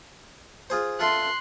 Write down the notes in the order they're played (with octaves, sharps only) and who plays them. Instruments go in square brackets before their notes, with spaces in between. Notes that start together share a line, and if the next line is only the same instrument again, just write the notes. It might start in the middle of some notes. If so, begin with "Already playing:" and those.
[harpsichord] F4 G#4 C5
[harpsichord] F4 A4 E5 [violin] C6 F#6